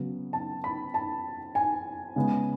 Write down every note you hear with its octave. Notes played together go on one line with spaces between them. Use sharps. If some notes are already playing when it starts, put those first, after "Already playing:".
Already playing: C#3 F#3 B3
A5
B5
A5
G#5
C#3 G#3 B3